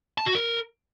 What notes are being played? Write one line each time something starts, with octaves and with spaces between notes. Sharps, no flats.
A5
F#4
A#4